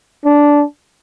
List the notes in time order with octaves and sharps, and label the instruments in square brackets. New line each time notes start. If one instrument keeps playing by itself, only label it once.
[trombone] D4